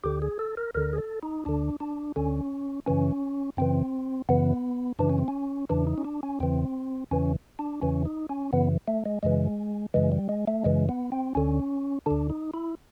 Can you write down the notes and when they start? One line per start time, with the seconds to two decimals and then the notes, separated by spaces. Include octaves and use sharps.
0.04 D2 D3 G4
0.22 G#4
0.39 A4
0.57 A#4
0.75 D2 D3 A#4
0.93 G#4
0.98 A4
1.23 D#4
1.45 D2 D3 D4
1.80 D4
2.16 D2 D3 C#4
2.86 F#2 C#3 E3 C#4
3.57 F#2 C#3 E3 C4
4.29 F#2 C#3 E3 B3
4.99 F#2 C#3 E3 D4
5.10 C#4
5.18 C4
5.28 C#4
5.69 E2 C#3 E3 D4
5.87 D#4
5.98 C#4
6.05 D4
6.23 C#4
6.40 E2 C#3 E3 C4
7.11 E2 C#3 E3 C#4
7.59 D4
7.81 E2 C#3 E3 C#4
8.05 D#4
8.29 C#4
8.52 F#2 C#3 E3 B3
8.88 A3
9.05 G#3
9.23 F#2 C#3 E3 G#3
9.94 F#2 C#3 E3 G#3
10.12 G3
10.29 G#3
10.47 A3
10.64 F#2 C#3 E3 G#3
10.89 B3
11.12 C4
11.35 D2 D3 C#4
12.06 D2 D3 D4
12.30 D#4
12.54 E4